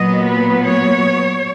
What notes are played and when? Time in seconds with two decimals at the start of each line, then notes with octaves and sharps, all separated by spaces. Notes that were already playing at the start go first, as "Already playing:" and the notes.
Already playing: A#2 F#3 B3 D#5
0.27 B4
0.66 C#5